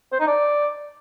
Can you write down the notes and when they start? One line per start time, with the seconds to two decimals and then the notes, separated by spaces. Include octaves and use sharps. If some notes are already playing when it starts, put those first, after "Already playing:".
0.12 C5
0.20 D#4
0.28 D5